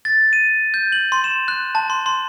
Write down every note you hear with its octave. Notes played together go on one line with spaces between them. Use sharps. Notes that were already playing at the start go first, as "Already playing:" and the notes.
A6
D#7
G6
F#7
C6
E7
F#6
A5
C6
C6